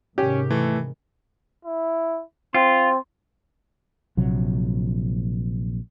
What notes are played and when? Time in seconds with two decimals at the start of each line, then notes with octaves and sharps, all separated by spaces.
0.18 G#2 C3 D#3 C#4 G4
0.50 E3 A3
1.65 E4
2.54 C4 F4 C6
4.17 A#1 C3 F#3